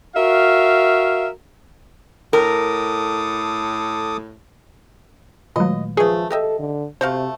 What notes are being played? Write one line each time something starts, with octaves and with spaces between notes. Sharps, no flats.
F#4 A#4 E5 F5
A2 A4 A#4 D6 D#6
A#2 D#3 F#3 G#3 A3 D#5
F3 A3 C#4 G#4 B4
G4 A4 D#5 E5 G5
D3
C3 A3 F#4 C5 F5